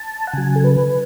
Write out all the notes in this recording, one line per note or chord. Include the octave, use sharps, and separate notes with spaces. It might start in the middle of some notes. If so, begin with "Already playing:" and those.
Already playing: A5
F#5
C#3 F#3 G#5
A4
B4